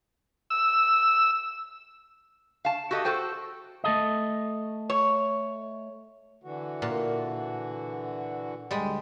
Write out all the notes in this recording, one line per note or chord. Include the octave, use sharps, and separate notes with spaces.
E6
F5 A5
F#4 G4 A4 D#5
F#4 A4 C5 G5
A3 A4 D#5
C#5
D3 E3 F#4
A#2
D2 G3 G#3